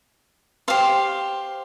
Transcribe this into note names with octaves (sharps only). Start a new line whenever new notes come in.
G4 C5 F5 C6